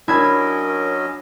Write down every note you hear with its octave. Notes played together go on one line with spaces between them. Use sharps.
F#3 C#4 D4 E4 A#4 D#5 B5 G#6